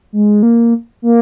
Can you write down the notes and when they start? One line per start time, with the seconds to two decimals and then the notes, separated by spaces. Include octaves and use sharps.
0.13 G#3
0.43 A#3
1.02 A#3